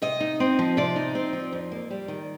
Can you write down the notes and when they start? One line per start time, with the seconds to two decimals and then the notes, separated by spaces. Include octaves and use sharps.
0.02 C3 D#5
0.20 D#4
0.40 C4
0.59 F3
0.77 C3 D5
0.96 D#4
1.15 C4
1.33 F3
1.52 F2
1.71 A#3
1.90 G3
2.08 D#3